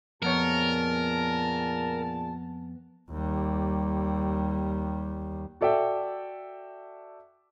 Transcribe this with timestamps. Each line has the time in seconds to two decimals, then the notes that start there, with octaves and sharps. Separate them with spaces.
0.22 F2 A#2 B3 G#4 A#4 C#5 A5
3.11 D#2 G3
5.61 F#4 A4 D5 E5 G5